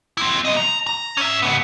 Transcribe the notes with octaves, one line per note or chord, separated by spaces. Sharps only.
C4 E4
C2 D#5
A#5
A#5
C#4 E5
C#2 B3